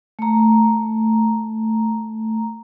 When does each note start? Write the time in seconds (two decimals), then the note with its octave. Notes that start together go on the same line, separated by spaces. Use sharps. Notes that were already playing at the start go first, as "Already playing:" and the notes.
0.19 A3 A#5